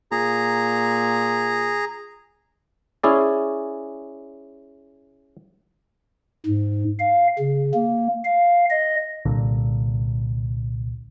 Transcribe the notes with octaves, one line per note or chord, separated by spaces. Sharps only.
A#2 G#4 A#5
C#4 E4 G#4 D5
G#2
F5
C#3
A#3
F5
D#5
C2 A#2 D3